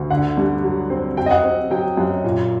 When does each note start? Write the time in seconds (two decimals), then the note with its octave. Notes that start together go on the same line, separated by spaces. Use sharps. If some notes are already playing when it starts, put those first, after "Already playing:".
Already playing: D2
0.10 D3 F#5
0.37 G2
0.64 F#3
0.90 C4
1.17 F#3 G5
1.26 D#5
1.31 F#5
1.44 C4
1.71 F#3 G5
1.97 F#2
2.24 A#2